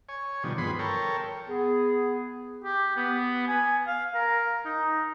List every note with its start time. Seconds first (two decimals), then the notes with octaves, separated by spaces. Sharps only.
0.09 C#5 G#5
0.44 B2 D3 D#3 F3 G3
0.58 G2 F3 B3 G#4 B5 C6
0.79 A4 A#4 C#5 G5
1.49 B3 G#4
2.64 G4
2.96 B3
3.48 G#5
3.87 F5
4.15 A#4
4.65 D#4